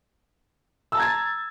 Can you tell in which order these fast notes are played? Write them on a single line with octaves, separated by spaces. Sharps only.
E6 A5 A#5 G#6 A6